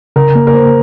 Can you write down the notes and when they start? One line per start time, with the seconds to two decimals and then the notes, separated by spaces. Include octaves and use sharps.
0.16 C#3 A#4
0.35 A#3
0.47 A#4
0.54 A#3 C5